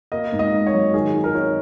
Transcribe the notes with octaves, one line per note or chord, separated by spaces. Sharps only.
A#3 D#5
G#2
D#5
G#2
C#5
F#3
D#3 G#4
D#3
A#4
D#4 C#5